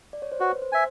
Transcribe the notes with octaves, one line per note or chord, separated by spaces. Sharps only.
D5
C#5
C5
F#4 B4
C5
E5 G#5